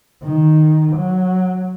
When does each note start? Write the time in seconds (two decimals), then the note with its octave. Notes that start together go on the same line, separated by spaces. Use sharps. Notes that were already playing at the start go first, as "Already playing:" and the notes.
0.23 D#3
0.96 F#3